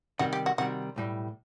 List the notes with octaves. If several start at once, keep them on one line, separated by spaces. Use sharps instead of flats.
C3 D#3 G3 F#4
G4
F#4
C3 D#3 G3 F#4
B1 A2 G3